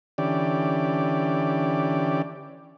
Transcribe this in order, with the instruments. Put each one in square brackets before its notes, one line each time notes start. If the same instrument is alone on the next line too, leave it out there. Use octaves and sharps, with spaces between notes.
[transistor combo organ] D3 E3 C#4 G4 D5